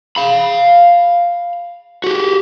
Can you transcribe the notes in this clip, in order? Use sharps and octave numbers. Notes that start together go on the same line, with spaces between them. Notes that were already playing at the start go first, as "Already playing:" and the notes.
F5 B5
F#4 G4